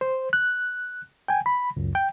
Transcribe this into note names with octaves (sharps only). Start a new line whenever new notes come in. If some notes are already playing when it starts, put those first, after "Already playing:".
C5
F#6
G5 G#5
B5
C#2 F#2
G5